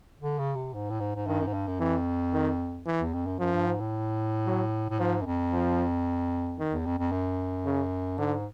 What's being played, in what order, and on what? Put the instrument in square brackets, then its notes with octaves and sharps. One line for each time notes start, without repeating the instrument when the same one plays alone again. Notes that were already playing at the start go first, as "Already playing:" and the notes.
[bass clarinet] D3
C#3
C3
G#2
A2
G#2
G#2
[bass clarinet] G2 [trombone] D#3
[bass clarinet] F#2
G#2
G2
F#2
[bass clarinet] F2 [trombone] E3
[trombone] D#3
E3
[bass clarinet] E2
F2
F#2
[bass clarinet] F#2 [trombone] F3
[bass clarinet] G2
G#2
A2
[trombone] F#3
[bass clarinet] A2
[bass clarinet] G#2 [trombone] F3
[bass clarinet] F#2
F2
[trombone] F3
D#3
[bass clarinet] E2
F2
F2
F#2
[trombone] C#3
[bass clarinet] G#2 [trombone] D3